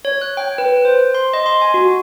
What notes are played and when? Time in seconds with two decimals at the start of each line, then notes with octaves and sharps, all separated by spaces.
0.05 C#5
0.22 F#6
0.37 G5
0.58 B4
0.85 C5
1.15 C6
1.33 D#5
1.46 C6
1.62 G#5
1.74 F#4